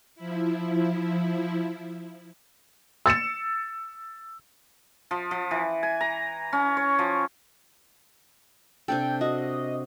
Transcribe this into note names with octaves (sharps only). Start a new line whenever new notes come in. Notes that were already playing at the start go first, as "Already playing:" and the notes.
F3 E4
E6 A6 C#7 E7
F3
F3
E3
G#5
A#5
C#4
C#5
F3
C3 D4 A4 G5
F#4 D#5